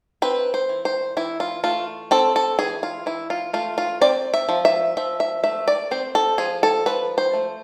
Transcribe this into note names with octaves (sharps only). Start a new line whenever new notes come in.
C4 B4
C5
E3
C5
E3 E4
F4
A3 F4
C4 A4
A4
E3 G#4
F4
E3 E4
F4
A3 F4
F4
C4 D5
E5
F3
E5
F3 E5
E5
A3 E5
D5
C4 C5
A4
F3 G#4
A4
F3 B4
C5
A3